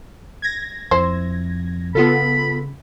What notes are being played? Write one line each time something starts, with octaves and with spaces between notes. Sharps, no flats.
G#6 A#6
F2 E4 C5
C#3 B3 F4 A4 B5